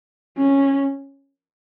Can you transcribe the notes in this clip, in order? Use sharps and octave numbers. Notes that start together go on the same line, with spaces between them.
C#4